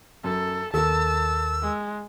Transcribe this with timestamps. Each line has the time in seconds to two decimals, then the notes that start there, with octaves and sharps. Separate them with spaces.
0.24 F#2 A4
0.74 D#2 A4 A#4 A5 E6
1.63 G#3